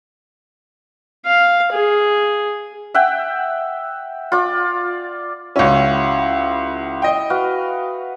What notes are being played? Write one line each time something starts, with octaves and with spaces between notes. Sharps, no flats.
F5
G#4
E5 F#5 G5
F4 D5
C#2 C#4 E4 F#4
D#5 G5
F#4 B4 F5